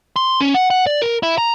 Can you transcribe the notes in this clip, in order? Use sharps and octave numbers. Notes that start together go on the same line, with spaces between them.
C6
C#4
F#5
F#5
D5
A#4
E4
A#5